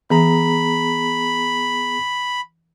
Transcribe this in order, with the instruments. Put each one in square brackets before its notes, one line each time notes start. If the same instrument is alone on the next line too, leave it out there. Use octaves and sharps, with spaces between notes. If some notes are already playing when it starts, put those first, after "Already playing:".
[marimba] E3 [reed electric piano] B3 G#4 A#5 [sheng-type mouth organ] B5